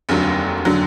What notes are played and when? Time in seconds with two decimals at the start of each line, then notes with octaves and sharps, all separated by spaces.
0.09 F1 D#2 D3 F#3
0.65 D3 F#3